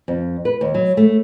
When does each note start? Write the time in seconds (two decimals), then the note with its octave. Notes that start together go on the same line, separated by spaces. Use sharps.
0.08 F2
0.45 B4
0.61 D#2
0.74 F#3
0.97 A3